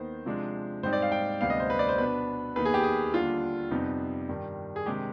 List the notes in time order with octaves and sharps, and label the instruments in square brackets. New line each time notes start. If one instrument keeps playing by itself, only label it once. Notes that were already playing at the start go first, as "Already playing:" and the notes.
Already playing: [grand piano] D#2 D#3 B3 D#4 C5
C3 F3 G#3 D4
G#2 G3 C4 D#4 C5
D5
F5
G5
D2 C3 G3 B3 D4 F5
D#5
C5
B4
D5
C5
B2 B3 D4 B4
D#2 D#3 B3 D#4 B4
G#4
G4
G#4
D#2 D3 G3 D4 F4
F2 C3 G3 B3 D#4
G2 D#3 G3
G#4
C3 D#3 G#3 D4 G4